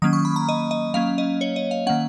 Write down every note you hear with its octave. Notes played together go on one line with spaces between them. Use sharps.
D#3 F#3 A#3 C#4 D#6
C#6
B5
A#5
D#5
D#5
F#3 A#3 C#4 F5
D#5
C#5
D#5
F5
D#3 A#3 C#4 F#5